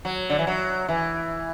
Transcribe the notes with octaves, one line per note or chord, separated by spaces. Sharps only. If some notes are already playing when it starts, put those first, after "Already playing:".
F#3
D3
E3
F#3
E3